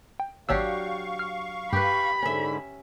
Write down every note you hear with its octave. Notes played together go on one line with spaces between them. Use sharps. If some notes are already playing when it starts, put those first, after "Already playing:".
G5
G#1 F#3 D4 G4 C#5 F5 C#6 E6
F6
G2 G4 B4 B5
G#2 D3 C#4 E5